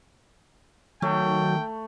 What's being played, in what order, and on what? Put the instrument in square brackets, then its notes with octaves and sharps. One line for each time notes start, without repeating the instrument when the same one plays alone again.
[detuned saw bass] D#3 [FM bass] F#3 [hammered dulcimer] A3 [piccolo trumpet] G5